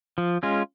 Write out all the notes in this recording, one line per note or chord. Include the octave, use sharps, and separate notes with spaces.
F3
G#3 C#4 F4